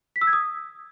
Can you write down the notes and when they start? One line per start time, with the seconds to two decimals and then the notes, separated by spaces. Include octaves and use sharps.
0.16 B6
0.21 E6
0.27 G#6
0.33 D#6